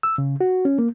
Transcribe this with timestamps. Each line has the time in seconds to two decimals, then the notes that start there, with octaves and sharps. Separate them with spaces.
0.03 E6
0.18 C#3
0.41 F#4
0.65 C#4
0.79 A#3